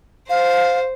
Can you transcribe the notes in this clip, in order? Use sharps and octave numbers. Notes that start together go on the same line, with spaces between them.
C5 F5